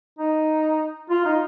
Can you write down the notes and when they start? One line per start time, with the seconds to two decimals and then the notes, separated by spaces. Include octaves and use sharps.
0.19 D#4
1.10 F4
1.25 D#4